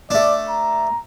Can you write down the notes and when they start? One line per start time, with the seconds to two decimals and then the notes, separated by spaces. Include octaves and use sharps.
0.11 A3 D4 D5
0.50 A#5